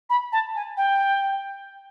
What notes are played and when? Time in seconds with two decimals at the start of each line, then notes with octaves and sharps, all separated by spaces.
0.10 B5
0.32 A5
0.55 G#5
0.77 G5